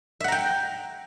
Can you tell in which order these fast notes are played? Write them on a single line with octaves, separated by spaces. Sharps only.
E5 F#5 A#5 G5